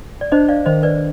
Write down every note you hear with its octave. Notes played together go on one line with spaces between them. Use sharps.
D5
D4 C5 D#5
D5 F5
D#3 C5 D#5
B4 D5